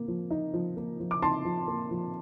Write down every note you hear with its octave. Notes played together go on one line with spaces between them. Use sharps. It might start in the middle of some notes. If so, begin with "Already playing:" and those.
Already playing: A#3
F3
D#4
F3
A#3
F3
D6
D#4 A5 C6
F3
A#3
F3